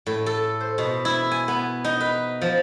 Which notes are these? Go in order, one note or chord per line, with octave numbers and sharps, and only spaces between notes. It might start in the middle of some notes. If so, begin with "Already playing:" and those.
A2
A4
C5
B2
E4
G#5
B3
D#4
B4
F3